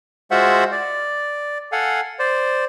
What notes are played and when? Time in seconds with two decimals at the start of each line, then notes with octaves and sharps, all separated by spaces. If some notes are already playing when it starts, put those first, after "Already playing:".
0.31 G#3 F4 F#4 C5 E5 F#5
0.72 D5
1.72 A4 F5 F#5 G#5
2.19 C5 D5